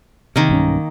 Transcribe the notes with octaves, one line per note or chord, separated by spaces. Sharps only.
C3 D#3 A#3
B1 G2 C#4